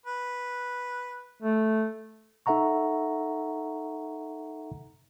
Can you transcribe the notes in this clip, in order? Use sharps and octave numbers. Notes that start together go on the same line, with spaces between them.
B4
A3
D#4 A4 E5 F#5 A#5 C#6